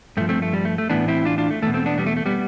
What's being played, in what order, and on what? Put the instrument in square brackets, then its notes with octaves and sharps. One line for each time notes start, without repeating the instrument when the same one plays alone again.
[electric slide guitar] G2 A3
F3
A3 C4
A3
G3
A3
A3
A2 E3 B3 D4
C4 E4
D4 F4
D4 F4
A3
E2 A3
B2
A3 C4
B3 D4
G3 B3
A3
A3
G3 B3